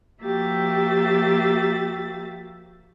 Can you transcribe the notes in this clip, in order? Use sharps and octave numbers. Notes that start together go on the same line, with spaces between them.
F3 A#3 F#4 G4 E5 A6